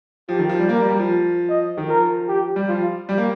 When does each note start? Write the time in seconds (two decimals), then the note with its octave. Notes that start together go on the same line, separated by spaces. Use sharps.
0.29 F3 G4
0.39 D#3
0.49 F3
0.59 G3
0.69 A#3 A#4
0.78 G3
0.89 G3
0.99 F3
1.49 D#5
1.77 D#3
1.88 F3 A#4
2.28 G4
2.56 G3
2.68 F3 F4
3.09 G3
3.18 A#3